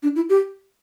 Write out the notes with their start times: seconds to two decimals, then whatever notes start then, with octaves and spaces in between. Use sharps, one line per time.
0.03 D4
0.16 E4
0.29 G4